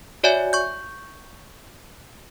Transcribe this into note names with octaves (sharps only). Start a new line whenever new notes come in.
F#4 C#5 D5 E5 G#5
C#6 G6